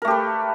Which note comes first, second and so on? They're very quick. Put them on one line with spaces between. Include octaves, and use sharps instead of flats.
A#4 A3 G4 B4